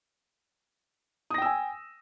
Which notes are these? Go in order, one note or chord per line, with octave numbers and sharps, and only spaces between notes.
G5 G#5 D#6 E6 A#6